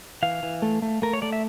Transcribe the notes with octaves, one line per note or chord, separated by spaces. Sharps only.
E3 F5
E3
A3
A3
A3 A#4
C#5
A3 D5
E5